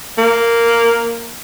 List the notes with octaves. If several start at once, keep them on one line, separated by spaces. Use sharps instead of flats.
A#3